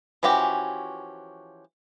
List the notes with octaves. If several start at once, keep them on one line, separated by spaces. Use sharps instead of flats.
E3 F3 C#4 F#4 G4